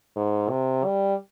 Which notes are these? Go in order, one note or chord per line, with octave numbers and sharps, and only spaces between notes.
G#2
C3
G3